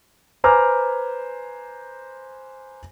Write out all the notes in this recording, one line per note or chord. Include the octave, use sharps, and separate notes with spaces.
B4 C5 G#5 A#5 D6 F6